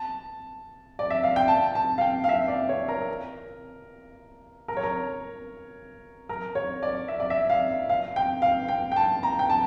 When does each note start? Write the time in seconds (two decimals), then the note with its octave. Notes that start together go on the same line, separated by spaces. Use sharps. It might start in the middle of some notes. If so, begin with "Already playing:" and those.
Already playing: A5
0.99 D5
1.10 E5
1.24 F5
1.36 G5
1.48 A5
1.75 A5
1.98 F5
2.01 G5
2.24 F5
2.29 E5
2.48 D5
2.69 C#5
2.88 A#4
4.68 A#4
4.77 C#5
4.83 A#4
6.29 A#4
6.55 C#5
6.83 D5
7.08 E5
7.20 D5
7.30 E5
7.50 F5
7.89 F5
8.16 G5
8.42 F5
8.68 G5
8.92 G5
8.96 A5
9.23 A#5
9.39 G5
9.50 A5